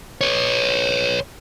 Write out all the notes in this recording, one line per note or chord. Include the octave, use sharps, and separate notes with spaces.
B4 C#5